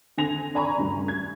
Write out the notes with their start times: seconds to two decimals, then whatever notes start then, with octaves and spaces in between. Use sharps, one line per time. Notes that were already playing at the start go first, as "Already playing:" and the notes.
0.18 D3 C4 G#5 A#6 F7
0.55 D5 G#5 A#5 B5 C#6
0.78 D2 G2 C#3
1.08 G#6